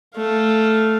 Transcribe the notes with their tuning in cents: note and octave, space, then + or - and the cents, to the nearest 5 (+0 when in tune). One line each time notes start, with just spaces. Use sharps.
A3 +0 F5 +0